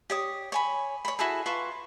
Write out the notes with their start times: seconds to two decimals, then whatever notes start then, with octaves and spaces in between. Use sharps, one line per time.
0.10 G4 C#5 D#6
0.52 C#5 G#5 B5
1.05 C#5 B5
1.19 E4 F#4 G#4 A4
1.46 F4 B4 A5 C#6